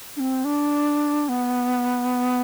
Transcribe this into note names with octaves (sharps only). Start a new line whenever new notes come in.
D4
C4
D4
B3